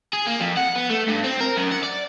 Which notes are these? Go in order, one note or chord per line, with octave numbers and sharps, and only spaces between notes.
G#4
A#3
F2
F#5
B3
A3
G2
C4
A#4
F#2
F#5
D5